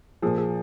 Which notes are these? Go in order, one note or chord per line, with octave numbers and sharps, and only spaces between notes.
A#2 F3 G#4
G#4